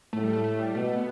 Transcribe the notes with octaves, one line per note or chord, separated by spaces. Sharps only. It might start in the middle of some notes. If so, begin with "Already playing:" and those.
A2 A3
G3
A3
A3
G3
B2 A3
A3
B3